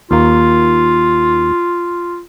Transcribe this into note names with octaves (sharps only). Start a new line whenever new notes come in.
D#2 A#3 F4